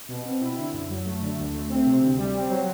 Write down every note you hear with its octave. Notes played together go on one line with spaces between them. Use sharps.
B2
C4
E4
D3
F#2
F#3
A3
D3
D2
A3
C4
C3
D2
G3
C4
F#3